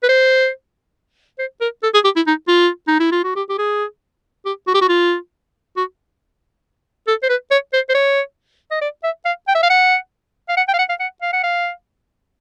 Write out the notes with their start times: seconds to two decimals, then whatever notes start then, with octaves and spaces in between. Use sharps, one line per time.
0.03 B4
0.09 C5
1.39 C5
1.61 A#4
1.83 A4
1.94 G#4
2.04 G4
2.16 E4
2.27 D#4
2.48 F4
2.88 D#4
3.00 E4
3.12 F4
3.24 F#4
3.36 G4
3.49 G4
3.58 G#4
4.45 G4
4.67 F#4
4.74 G4
4.81 F#4
4.89 F4
5.77 F#4
7.07 A4
7.23 C5
7.29 B4
7.51 C#5
7.73 C5
7.89 C5
7.95 C#5
8.71 D#5
8.81 D5
9.04 E5
9.25 F5
9.48 G5
9.55 E5
9.63 F5
9.70 F#5
10.49 F5
10.57 F#5
10.68 G5
10.73 F5
10.79 F#5
10.89 F5
11.00 F#5
11.22 F5
11.33 F#5
11.44 F5